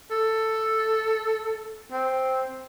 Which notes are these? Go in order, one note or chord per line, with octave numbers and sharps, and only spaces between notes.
A4
C4